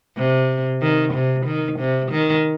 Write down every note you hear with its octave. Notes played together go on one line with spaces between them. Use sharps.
C3
D#3
C3
D#3
C3
D#3